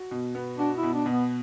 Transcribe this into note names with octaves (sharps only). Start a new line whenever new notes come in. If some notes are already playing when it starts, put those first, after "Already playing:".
Already playing: F#4
B2
B3
D4 F#4
E4
B2
D4
B2
B3